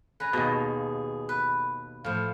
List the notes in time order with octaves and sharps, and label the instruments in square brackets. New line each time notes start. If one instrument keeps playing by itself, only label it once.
[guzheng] B4 G#5 A#5
[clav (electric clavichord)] D#2 B2 [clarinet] G#4 [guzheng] F5 A5 A#5
[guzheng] B4
[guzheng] A2 F3 [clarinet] F5